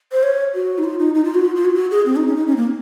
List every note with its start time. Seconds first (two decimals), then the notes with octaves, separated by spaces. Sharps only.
0.12 C5
0.23 C#5
0.54 F#4
0.78 D#4
0.84 F4
0.99 D#4
1.15 D#4
1.24 F4
1.35 F#4
1.45 F4
1.56 F4
1.65 F#4
1.75 F#4
1.91 G#4
2.06 C4
2.16 D#4
2.27 C#4
2.36 D#4
2.47 C#4
2.52 C4
2.56 A#3